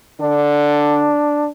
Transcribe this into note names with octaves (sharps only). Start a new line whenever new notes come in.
D3 D4